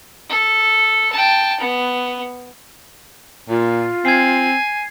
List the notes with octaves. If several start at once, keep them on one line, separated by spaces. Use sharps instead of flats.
A4
G5 A5
B3
A#2 F4
C4 G#5 G#6 C7